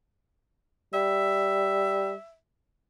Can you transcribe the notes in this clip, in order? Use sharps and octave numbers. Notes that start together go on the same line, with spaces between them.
G3 E5